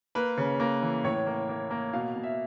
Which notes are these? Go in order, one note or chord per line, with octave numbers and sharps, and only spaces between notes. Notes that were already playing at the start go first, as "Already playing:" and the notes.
A#3 B4
C#3
A#3
E3
A2 C#5
A#3
A#3
A#3
B2 F5
B2
E5